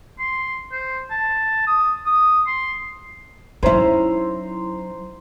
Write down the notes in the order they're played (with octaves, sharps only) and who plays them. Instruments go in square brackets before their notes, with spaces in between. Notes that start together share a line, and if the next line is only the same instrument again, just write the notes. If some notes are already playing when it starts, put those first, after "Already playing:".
[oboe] C6
C5
A5
D#6
D#6
C6
[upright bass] F#3 D#4 [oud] C#4 E4 [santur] C5 A#5